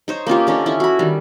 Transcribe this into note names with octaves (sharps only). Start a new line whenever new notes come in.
D#4 C5 C#5
A#3 C#4 F4 G4
D3 C#4 D#4 A4
C#4 E4
F#4 B5
D#3 G3